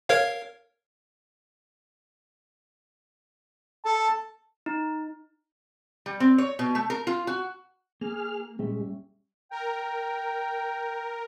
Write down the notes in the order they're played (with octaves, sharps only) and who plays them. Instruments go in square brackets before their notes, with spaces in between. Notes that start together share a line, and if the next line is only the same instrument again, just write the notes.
[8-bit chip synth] A#4 C#5 F5
[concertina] A4 [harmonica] A5
[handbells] D#4
[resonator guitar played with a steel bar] G3
C4
C#5
B2
A3
A#4
F4
F#4
[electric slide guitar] A#3 [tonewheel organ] G#4 F6
[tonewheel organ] A#2 G#3 [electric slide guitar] G3 C#4 E5
[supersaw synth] A#4 [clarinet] G5